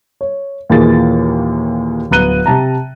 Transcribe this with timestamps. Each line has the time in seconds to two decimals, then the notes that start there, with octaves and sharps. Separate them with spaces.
0.21 C#5
0.70 D#2 A#2 E3 G#4 A6
2.11 D1 B3 A#5 F#6 D#7 G7
2.46 C3 A5 A#5